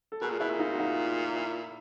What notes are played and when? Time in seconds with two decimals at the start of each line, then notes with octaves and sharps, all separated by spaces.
0.12 A4
0.21 B2 G#4 A#4
0.30 A#2
0.39 B2 E4
0.50 A#2
0.59 D#4 F4
0.72 F#4
0.79 D#4 F4
1.36 E4